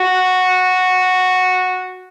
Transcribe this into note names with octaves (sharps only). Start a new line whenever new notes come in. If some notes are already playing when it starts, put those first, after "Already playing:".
Already playing: F#4